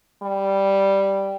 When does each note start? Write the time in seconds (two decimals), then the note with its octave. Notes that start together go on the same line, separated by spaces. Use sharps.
0.23 G3